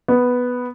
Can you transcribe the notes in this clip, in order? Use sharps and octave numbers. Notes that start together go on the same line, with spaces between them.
B3